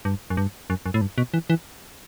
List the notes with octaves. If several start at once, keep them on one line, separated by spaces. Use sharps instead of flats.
G2
F#2
G2
F#2
F#2
A2
G2
B2
E3
E3